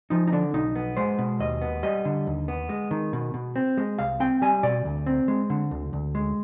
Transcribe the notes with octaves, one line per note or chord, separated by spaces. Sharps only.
F3 D#4
D#4
D3 D4
B1 D#4
B3
G#3 C5
B2
D#2 D#5
B3
G3 D#5
D3
D#2
B3
G#3
D#3
B2
B2
C4
G#3
C2 F5
C4 G5
G3 G#5
B2 D5
D2
C4
G#3
D3
D2
D2
G#3